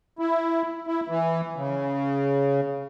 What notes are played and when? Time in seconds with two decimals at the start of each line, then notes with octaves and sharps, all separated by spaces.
0.19 E4
0.87 E4
1.08 E3
1.56 C#3